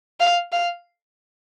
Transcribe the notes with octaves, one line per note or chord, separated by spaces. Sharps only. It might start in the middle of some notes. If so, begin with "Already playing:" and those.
F5
F5